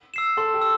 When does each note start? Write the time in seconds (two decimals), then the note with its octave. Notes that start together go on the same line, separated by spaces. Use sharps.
0.14 E6 C7 E7
0.37 A4 C6
0.54 G4
0.61 E6